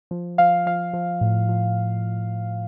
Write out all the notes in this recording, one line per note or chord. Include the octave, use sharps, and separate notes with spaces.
F3
F3 F5
F3 F5
F3
A2
F3